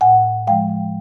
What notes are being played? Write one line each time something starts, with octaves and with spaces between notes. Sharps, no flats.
A2 F#5 G#5
F3 G#3 F5 G5